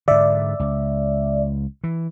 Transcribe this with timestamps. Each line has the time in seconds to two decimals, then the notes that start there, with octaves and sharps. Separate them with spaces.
0.08 G#2 D3 D5 E5
0.60 C#2
1.84 E3